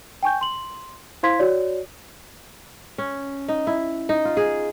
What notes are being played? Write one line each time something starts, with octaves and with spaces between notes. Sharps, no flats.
G5 G#5 C#6 G6
C6 F#7
E4 C5 F5 C6 G#6 B6
F#4 C#5 D5
C#4
D#4
E4
D#4
F4
G#4